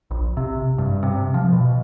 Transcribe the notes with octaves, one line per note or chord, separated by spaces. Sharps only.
A#1
C3
G2
C3
F3
B2